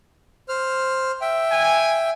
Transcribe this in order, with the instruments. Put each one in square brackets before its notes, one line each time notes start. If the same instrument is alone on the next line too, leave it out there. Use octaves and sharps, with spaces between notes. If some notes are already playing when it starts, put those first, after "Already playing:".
[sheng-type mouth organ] C5 F6
E5 G5
[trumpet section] G#5